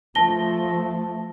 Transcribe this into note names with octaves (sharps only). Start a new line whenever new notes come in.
F3 A3 A5 A#6 G7